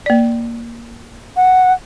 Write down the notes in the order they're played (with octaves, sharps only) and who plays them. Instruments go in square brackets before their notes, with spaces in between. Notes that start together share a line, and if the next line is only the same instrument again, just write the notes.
[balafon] A#3 D5
[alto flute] F#5